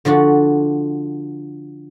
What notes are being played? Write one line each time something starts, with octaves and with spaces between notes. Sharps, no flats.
D3 F3 D4 F#4